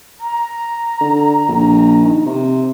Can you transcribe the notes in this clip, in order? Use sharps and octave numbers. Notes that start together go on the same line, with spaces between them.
A#5
D3
A#1
D#3
C3